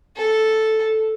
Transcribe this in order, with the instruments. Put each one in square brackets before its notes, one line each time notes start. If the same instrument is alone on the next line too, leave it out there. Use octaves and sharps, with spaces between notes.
[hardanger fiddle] A4